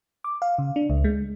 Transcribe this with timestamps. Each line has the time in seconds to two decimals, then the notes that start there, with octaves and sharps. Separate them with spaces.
0.24 D6
0.42 F5
0.58 C#3
0.76 D4
0.90 C#2
1.04 G#3